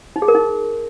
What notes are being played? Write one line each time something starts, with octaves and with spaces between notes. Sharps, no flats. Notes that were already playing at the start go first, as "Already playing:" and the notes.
D#4
G#4
A#4
D#4